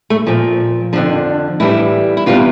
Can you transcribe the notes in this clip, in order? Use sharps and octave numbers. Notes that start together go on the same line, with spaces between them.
A3
A#2 F3
F2 D3 F3 D4
A2 E3 G3 E4
E4
E2 C3 E3 G3 F4